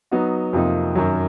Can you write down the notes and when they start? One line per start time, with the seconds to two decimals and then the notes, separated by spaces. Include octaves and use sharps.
0.11 F#3 B3 D#4 F#4
0.53 F2 C3 F3 A#3 D#4
0.95 F#2 D#3 F#3